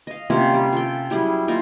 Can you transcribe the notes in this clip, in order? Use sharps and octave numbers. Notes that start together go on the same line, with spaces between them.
D#5 F5
C3 A#3 C#4 F4
G3
F4 A4 G5
F#3 G3 E4 G#4
A#3 D#4 F4